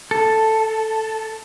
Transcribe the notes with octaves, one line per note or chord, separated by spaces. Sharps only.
A4